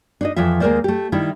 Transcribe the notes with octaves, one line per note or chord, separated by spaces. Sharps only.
D4 D#4 D#5
F2 E3 F3 F4 E5
D#2 G#3 A#3 A#4 C5 D5
A3 G4
D#3 G3 E4